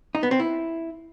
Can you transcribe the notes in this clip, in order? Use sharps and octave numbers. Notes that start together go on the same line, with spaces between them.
D#4
B3
C4
E4